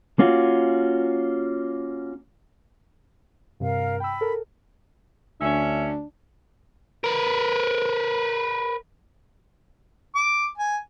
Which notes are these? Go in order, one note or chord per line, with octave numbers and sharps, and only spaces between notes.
A#3 C#4 F4 F#4
G2 C3 A#4 F5
G5 B5 E6
A4 A#4
D2 C#4 D4 E5
A#4 B4
D6
G#5